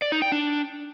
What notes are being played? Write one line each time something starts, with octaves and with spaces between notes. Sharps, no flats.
D5
D#4
G5
D4